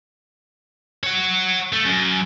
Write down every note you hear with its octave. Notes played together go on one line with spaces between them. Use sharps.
C#5 F#5
A3
F#2